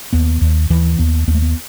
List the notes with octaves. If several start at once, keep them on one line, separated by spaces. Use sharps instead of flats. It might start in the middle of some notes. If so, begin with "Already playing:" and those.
D#2 B3
D#2
D#2 E3
D#2 B3
D#2 B3
A3
B3